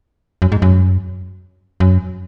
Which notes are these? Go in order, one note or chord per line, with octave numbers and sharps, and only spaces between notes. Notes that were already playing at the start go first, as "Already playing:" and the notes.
F#2
G#2
F#2
F#2